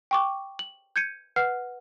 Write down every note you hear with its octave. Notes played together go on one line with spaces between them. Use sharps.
G5 C#6 D6
F#7
G6 G#6 C#7 D#7
B4 F#5 F6 C7